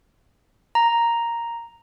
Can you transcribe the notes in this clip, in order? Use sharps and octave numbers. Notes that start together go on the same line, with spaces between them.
A#5